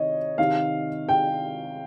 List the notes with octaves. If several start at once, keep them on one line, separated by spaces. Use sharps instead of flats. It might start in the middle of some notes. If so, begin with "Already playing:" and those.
Already playing: C3 D#3 C#5 D#5
C3 D#3 F5
G5